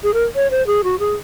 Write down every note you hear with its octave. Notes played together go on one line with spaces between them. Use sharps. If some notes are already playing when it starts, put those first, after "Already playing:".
G#4
A#4
C#5
C5
G#4
F#4
G#4